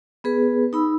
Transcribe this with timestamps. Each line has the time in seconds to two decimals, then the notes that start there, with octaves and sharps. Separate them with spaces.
0.24 B3 G#4 B4
0.73 D#4 B5 E6